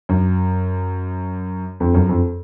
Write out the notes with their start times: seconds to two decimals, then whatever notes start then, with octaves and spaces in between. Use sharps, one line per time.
0.09 F#2
1.80 F2
1.94 F#2
2.09 F2